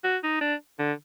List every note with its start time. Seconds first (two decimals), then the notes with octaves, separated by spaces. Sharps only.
0.04 F#4
0.24 D#4
0.41 D4
0.79 D3